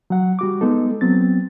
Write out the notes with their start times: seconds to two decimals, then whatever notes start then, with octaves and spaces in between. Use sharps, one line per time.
0.10 F#3 F#5
0.39 G3 F#4 D6
0.61 G#3 B3 D#4 A4
1.01 F#3 B3 C4 A6